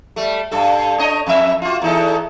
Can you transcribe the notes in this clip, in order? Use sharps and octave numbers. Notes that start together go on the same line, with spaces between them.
G3 A3
G2 A4
D4 C#5 D#5
F2 E5
F4 F#4
E2 D#4 A4